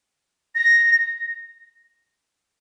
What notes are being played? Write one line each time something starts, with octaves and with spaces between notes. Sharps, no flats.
A#6